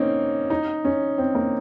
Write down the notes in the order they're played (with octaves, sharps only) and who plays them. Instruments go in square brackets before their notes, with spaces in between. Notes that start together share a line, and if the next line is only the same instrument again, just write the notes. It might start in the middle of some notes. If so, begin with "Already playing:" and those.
Already playing: [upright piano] A#3 C4 C#4 D#4
D#4
C#4
C4
A#3